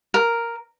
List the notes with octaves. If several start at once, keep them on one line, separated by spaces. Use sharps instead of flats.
A#4